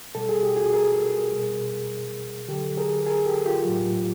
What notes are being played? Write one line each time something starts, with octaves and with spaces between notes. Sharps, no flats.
B2 G3 A4
G#4
G4
F#4 G#4
G#4 A#4
B2 G3
D3 F#3 G4 A4
G#4 A#4
G#4 A#4
G4 A4
F4 G4
A2 F#3